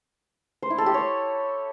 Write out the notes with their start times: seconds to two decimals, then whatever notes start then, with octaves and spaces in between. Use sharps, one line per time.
0.62 C5
0.70 E4
0.78 A4
0.86 G4
0.94 C#5